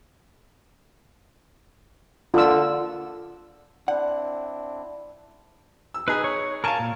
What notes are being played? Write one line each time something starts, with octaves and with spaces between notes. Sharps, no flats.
D3 F4 E6
C4 D4 E4 D5 F#5
E6
D#4 G#4 B4
C#5
A#4 F5 G#5 A5 C#6
A#2